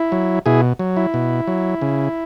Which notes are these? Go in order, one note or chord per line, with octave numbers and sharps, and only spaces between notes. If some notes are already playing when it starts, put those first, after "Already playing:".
Already playing: E4
F#3
B2 E4 G#4
F#3
E4
B2
F#3
C#3